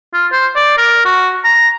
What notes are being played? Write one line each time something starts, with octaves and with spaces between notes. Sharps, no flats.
F4
C5
D5
A#4
F#4
A#5